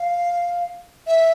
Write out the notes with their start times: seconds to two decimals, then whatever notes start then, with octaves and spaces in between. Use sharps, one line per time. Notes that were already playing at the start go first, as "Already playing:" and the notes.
Already playing: F5
1.07 E5